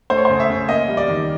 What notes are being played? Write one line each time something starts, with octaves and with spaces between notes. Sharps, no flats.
A3 C5
C#5
C#3 C5
E5
C#3
A#3 D#5
G3
D5
D#3